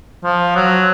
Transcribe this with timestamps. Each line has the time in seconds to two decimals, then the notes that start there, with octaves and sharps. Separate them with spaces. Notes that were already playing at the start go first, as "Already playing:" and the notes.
0.24 F3
0.56 F#3